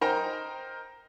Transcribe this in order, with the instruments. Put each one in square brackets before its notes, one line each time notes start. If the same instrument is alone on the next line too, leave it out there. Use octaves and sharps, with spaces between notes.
[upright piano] D#4 A#4 C5 D#5 G5 A#5